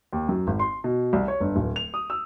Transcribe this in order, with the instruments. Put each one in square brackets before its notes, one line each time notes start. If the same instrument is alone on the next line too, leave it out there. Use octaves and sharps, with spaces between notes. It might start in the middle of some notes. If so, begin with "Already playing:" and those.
[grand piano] D#2
F#2
G#1
C6
B2
C2
C#5
G1
D1
F7
D#6
E6